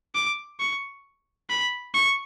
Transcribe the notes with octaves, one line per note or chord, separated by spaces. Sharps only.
D6
C#6
B5
C#6